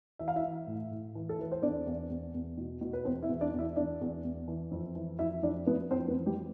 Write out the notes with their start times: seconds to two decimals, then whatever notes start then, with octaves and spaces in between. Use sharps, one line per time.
0.19 E3 E5
0.28 F5
0.35 E4 E5
0.44 E3
0.67 A2
0.91 A2
1.15 E3
1.29 A4
1.39 E3 B4
1.52 C5
1.62 E2 D4 D5
1.86 E2
2.10 E2
2.34 E2
2.57 B2
2.81 B2
2.93 B4
3.05 E2 C4 C5
3.23 E4 E5
3.29 E2
3.41 D4 D5
3.53 E2
3.59 E4 E5
3.76 E2 D4 D5
4.01 E2
4.24 E2
4.48 E3
4.71 F2
4.95 E3
5.19 F2 E4 E5
5.43 F2 D4 D5
5.66 F2 B3 B4
5.91 F2 C4 C5
6.08 B3 B4
6.15 E3
6.26 G3 G4